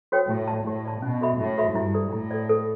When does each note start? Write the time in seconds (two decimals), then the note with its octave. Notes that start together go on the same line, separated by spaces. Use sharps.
0.12 F#4 A4 C#5 G5
0.30 A2 G4
0.48 D5 A5
0.67 A2 G4
0.85 D5 A5
1.02 B2 C#4
1.21 F#4 A4 E5 B5
1.39 A2 C#4
1.57 F#4 A4 E5 B5
1.75 G2 E4
1.94 A4 D5
2.13 A2 E4
2.31 A4 D5
2.49 A4